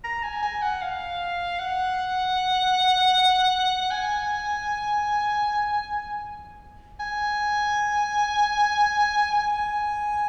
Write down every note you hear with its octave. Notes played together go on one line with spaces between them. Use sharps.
A#5
G#5
G#5
F#5
F5
F#5
G#5
G#5
G#5